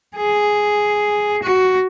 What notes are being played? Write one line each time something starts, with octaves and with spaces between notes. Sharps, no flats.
G#4
F#4